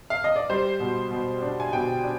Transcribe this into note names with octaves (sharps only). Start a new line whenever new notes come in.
F5
D#5
D5
G3 C5
B2
B2
D4
G#5
B2 G5
D4